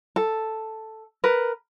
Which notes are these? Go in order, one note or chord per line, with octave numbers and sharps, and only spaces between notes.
A4
A#4 B4